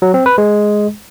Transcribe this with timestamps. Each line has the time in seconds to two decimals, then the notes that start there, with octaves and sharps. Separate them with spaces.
0.02 F#3
0.14 C4
0.26 B4
0.38 G#3